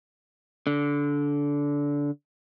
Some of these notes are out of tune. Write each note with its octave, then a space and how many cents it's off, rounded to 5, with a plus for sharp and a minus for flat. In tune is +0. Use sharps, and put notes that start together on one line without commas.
D3 -20